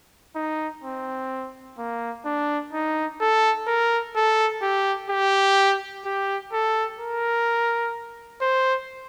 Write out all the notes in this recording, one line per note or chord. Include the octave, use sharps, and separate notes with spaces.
D#4
C4
A#3
D4
D#4
A4
A#4
A4
G4
G4
G4
A4
A#4
C5